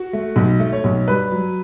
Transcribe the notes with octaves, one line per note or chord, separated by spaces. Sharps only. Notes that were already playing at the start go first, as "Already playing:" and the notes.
Already playing: F#4
A3
B1
A3
C#5
B1
G2 B4
F#3